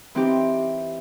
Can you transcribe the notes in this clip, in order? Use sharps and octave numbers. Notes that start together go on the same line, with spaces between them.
E3 C4 D#4 G4